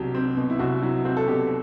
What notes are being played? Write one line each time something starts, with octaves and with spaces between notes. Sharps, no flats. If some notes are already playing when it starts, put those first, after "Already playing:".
Already playing: C2 B2 F#3 G4
C4
B2
E4
C2 F#4
F#3 E4
C4 F#4
A4
B2 G4